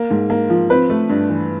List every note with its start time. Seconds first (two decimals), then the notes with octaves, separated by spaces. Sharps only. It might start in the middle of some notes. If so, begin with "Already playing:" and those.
Already playing: A#3
0.10 G#2
0.30 A#3
0.50 F3
0.70 C4 B4
0.90 A3
1.09 G2
1.29 E3